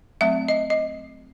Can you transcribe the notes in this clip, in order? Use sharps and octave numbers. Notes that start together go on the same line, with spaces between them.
F#3 A3 C4 E5
D#5
D#5